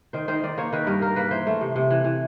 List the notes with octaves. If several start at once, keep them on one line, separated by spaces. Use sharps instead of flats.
D#3 C5
D#3 C5
D#3 D5
A#3 C#5
D#3 B4
G2 A#4
A#3 A#4
A#3 B4
E3 C5
A3
C3
C3
E3
E3